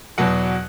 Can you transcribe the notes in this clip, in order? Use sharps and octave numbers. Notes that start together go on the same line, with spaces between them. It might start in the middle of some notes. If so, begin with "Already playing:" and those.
E2 B2 F#3 F#5